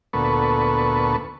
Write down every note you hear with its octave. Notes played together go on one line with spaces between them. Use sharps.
D2 A#2 B3 A4 B4 C#6